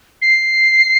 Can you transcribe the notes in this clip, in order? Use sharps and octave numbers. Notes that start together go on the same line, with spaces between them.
C7